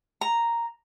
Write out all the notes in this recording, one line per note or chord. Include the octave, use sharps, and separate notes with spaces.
A#5